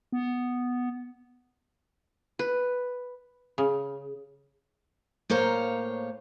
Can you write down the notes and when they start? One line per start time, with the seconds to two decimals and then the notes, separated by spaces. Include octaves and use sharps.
0.12 B3
2.39 B4
3.58 C#3
5.30 A2 A#3 C5 C#5 F5 A#5